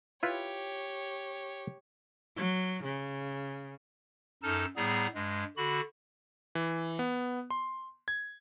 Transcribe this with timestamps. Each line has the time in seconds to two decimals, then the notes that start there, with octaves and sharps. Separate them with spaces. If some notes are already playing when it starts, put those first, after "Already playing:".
0.23 E4 F4 G4 B4 C#5
2.36 F#3
2.84 C#3
4.43 F#2 D#4 A4 A5 F6
4.77 A2 G3 B3 G#4 A#5
5.15 G2 G#3
5.57 D3 F#4 B5
6.55 E3
6.99 B3
7.51 C6
8.08 G#6